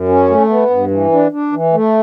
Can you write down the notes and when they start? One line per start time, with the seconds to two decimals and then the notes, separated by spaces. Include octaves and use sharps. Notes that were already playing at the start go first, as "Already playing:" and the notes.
Already playing: F#2
0.08 C#4
0.30 A3
0.50 B3
0.70 G2
0.91 E3
1.12 D4
1.32 D4
1.52 E3
1.73 A3